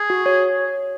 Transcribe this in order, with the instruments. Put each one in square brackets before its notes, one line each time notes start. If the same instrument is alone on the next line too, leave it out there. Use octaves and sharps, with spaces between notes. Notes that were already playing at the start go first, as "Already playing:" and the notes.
Already playing: [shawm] G#4
[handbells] F#4
C#5